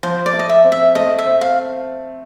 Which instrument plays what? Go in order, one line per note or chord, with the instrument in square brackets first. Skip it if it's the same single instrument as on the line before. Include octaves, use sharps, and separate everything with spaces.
[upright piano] F3 [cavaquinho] C5
[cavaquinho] D5
[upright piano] A3
[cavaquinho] D#5
E5
[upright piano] C4
[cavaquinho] E5
[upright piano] A3 [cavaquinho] D#5
[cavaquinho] E5
[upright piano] C4
[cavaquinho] F5